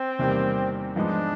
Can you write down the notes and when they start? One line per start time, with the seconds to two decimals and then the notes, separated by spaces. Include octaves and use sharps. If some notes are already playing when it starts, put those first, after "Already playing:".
Already playing: C4
0.19 E2 C3 D#3 G3 A#3
0.96 G#2 F3 G#3 B3 D4